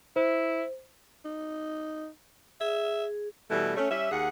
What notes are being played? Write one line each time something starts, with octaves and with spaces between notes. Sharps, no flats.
E4 C5
D#4
G#4 E5
B2 E3 G3 A3
A3 C#4
G3 C#4 E5
D#2 G#4 F#5